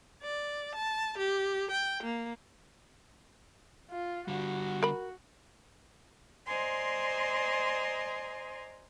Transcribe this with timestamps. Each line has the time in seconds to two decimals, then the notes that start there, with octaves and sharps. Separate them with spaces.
0.23 D5
0.76 A5
1.18 G4
1.71 G5
2.03 A#3
3.90 F4
4.28 D3 G3 F#4
4.83 A#4 B5
6.46 C5 D5 D#5 G#5 A#5 C6